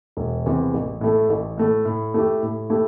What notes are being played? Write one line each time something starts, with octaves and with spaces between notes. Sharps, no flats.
E1
E2 C3 E3
A1
A2 A3
A1
A2 A3
A2
A3 E4 G4
A2
A3 E4 G4